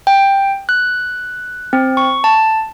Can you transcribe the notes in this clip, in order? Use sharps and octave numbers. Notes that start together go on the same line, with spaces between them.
G5
F#6
C4
C#6
A5